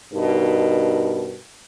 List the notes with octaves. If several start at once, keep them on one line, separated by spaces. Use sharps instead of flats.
G2 B2 D#4 A#4